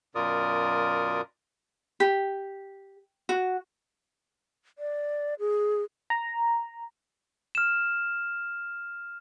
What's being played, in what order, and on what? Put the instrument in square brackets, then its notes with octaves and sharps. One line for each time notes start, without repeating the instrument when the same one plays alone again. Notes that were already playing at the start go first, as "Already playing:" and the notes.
[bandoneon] F#2 B2 F4 A#4 D5 D#6
[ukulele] G4
F#4
[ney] D5
G#4
[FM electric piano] A#5
[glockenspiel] F6 E7